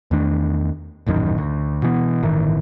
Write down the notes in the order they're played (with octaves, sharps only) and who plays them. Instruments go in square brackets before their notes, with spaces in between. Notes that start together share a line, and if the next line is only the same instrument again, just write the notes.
[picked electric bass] E2 D#3 A3 D4
D#1 A1 F#2 D#3
D2
B2 E3 B3
G1 A2 D#3 E3